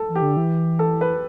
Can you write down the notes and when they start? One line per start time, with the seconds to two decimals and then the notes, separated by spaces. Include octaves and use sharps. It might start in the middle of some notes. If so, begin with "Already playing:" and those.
Already playing: A4
0.09 E3
0.15 G4
0.22 D3
0.37 E3
0.79 A4
1.01 B4